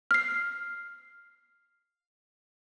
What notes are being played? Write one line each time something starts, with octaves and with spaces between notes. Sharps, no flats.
F6 C7